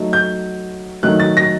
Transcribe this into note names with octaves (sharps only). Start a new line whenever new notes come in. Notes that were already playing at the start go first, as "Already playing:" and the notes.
Already playing: F#3 A3 D#4
G6
D#3 F#3 A3 D#4 F#6
A6
A#6